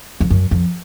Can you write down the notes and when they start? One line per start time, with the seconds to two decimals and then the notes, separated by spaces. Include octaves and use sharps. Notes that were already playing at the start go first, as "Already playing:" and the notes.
0.20 F2
0.30 F#2
0.51 F2